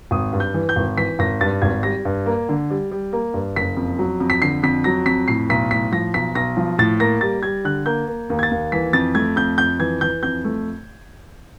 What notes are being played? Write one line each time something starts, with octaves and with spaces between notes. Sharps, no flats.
G#1 D#6
G2
G6
E3
G6
G#1
E3 B6
G#1 A#6
G2 A6
G#1 G#6
G3 A#6
G2
A#3
D3
G3
G3
A#3
G2
F#1 B6
F2
F#3
F2
B6
D3 C7
F2 B6
F#3 A#6
F2 B6
A2 C7
B1 B6
A2 B6
F3 A#6
B1 B6
B1 A#6
F3
A2 A6
A#3 A#6
G3 A6
G3 G#6
D3 F#6
A#3 G6
A#3
D#2
G#6
A6
D#2
E3 B6
F2 A6
A3 G#6
F2 G6
F2 G6
E3 G#6
E3 G6
F2 G6
A3